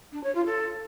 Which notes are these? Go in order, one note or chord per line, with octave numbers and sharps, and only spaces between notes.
D4
C#5
F4
A4